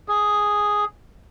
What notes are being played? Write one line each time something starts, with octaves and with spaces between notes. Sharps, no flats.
G#4